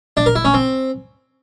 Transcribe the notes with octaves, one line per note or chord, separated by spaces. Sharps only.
D4
A#4
E4
C#4
C4